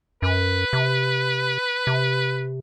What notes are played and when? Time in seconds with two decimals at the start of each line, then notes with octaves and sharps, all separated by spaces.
0.22 F#2 B4
0.73 C3
1.87 C3